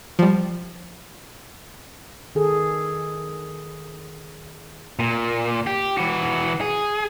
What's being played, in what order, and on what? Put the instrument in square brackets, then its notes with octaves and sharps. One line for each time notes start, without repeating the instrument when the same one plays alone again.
[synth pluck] F3 G3
[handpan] D#3 G#4 A4
[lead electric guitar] A#2
G4
E3 F#4
G#4